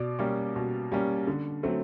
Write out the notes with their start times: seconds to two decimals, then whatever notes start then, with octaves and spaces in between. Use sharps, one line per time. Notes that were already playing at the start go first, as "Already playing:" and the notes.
Already playing: B2 D5 D6
0.19 G3 A#3 C#4
0.56 B2
0.92 G3 A#3 C#4
1.27 D3
1.63 F#3 A3 C4